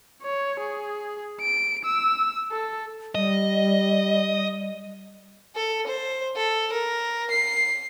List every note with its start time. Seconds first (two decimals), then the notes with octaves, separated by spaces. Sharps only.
0.23 C#5
0.60 G#4
1.41 D7
1.85 E6
2.51 A4
3.15 G3 D#5
5.55 A4
5.87 C5
6.36 A4
6.72 A#4
7.31 C7